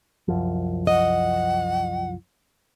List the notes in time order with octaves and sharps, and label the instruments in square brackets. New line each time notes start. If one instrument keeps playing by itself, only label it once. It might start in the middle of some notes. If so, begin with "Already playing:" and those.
[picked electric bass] C2 F#2 F3
[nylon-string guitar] D#5 [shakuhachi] F#5